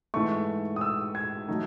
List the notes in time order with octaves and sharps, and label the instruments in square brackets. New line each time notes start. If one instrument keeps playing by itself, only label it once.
[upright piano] G#2 E3 A3 C#6
D#6
E6
G#6
F#3 A3 D#4